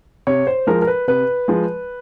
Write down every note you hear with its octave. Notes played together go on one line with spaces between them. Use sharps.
C3 C#5
C5
F3 G#3 A#4
A#4
B4
C3 B4
F3 G#3